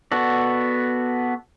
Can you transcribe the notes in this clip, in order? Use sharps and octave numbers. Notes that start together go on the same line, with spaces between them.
B3 F#4 A4 D5